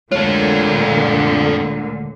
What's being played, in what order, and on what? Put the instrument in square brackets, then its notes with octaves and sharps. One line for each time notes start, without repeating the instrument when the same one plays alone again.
[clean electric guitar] D2 G#3 [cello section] A#2 D3 [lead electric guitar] F4 A4 [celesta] C#5